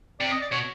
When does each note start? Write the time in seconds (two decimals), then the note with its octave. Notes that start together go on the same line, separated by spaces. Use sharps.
0.20 C3 D5
0.31 D#5
0.41 D5
0.52 B2 C#5